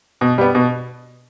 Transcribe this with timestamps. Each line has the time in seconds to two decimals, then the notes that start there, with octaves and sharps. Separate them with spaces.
0.21 B2
0.38 G3 B3
0.55 B2